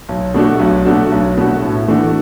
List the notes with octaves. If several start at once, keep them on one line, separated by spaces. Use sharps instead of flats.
B1
B2 A3 D4 F#4
B1
B2 A3 D4 F#4
B1
B2 A3 D4 F#4
A2
E3 A3 D4 F#4